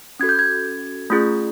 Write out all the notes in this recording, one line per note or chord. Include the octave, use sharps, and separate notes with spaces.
C#4 F#4 A4 G#6
G6
G#6
A3 C#4 F4 G#4